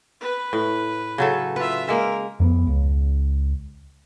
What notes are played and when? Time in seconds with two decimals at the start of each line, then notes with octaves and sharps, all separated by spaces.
0.21 B4
0.53 A2
1.18 C#3 F#3 A4
1.56 F4 B4 E5
1.89 G#3 A#3 A#4
2.40 F2 A#3 B3
2.67 C#2